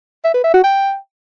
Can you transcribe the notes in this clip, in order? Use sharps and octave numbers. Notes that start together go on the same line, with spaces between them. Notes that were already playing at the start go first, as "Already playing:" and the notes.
E5
B4
E5
F#4
G5